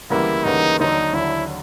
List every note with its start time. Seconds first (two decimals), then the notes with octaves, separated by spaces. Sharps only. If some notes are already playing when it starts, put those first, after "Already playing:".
0.10 D2 C#3 E3 G3 A#3 E4
0.44 D2 C#3 E3 G3 A#3 D#4
0.79 D#2 D3 F#3 D#4
1.13 D#2 D3 F#3 E4